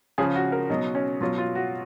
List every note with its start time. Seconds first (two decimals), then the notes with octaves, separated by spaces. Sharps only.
0.18 C#3 F3 G#4
0.35 F#4
0.52 A#4
0.70 B2 F#3 D#4
0.95 C#4
1.21 B2 F#3 F4
1.38 F4
1.55 F#4